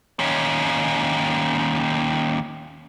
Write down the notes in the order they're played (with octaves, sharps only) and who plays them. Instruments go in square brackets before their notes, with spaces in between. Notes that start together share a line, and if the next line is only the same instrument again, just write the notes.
[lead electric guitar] D#2 C#4